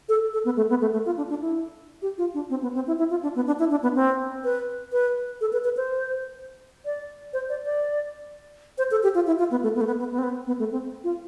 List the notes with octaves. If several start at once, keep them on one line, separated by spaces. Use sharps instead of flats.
A4
A4
B3
A3
B3
A3
A3
F4
D4
D4
E4
G4
F4
D4
C4
B3
C4
E4
E4
F4
D4
B3
D4
E4
D4
B3
C4
B4
B4
A4
B4
B4
C5
D5
C5
D5
D5
C5
A4
G4
F4
E4
F4
B3
A3
B3
A3
B3
B3
B3
C4
B3
B3
A3
C4
F4